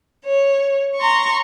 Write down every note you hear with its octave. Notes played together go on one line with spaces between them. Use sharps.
C#5
A#5 C6 C#6